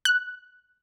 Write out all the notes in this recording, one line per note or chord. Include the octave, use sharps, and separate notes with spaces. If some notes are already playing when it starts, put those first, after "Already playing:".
F#6